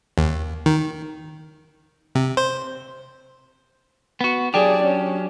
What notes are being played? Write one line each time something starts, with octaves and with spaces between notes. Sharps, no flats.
D#2
D#3
C3
C5
B3 F#4
F#3 D4 G4 G#4 D5
C#4